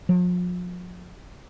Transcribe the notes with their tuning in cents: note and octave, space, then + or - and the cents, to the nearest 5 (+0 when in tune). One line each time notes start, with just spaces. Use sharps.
F3 +40